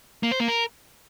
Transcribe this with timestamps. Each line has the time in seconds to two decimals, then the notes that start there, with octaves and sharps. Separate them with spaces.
0.23 A#3
0.31 C5
0.40 A#3
0.48 A#4